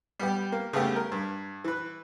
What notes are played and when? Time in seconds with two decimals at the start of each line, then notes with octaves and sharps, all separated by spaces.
0.20 G3 B3 G4
0.52 A#3
0.73 C#3 A3 B3 G4
0.96 A#4
1.12 G2
1.64 E3 B4